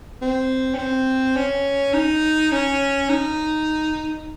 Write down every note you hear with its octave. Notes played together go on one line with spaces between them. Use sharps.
C4
C#4
C4
C#4
D#4
C#4
D#4